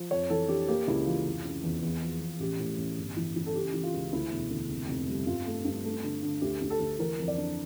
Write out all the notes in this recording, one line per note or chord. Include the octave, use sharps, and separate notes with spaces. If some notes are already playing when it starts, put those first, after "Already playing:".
Already playing: F3
F2 C#5
E3 A4
D4 G4
A#3 G4
C#2 E4
E3 F4
F1
C#3
E2
E2
F3
E2
A1 G4
A2
A1
G1
E3
E3
A4
C#3 G4
E3
F4
C#2
D2 E4
E1
D2
F1
F1
G3
G2 F4
A3
G2
A3
D3
D3
D2 G4
D2
A4
D2
E3 A#4
F2
D5
D4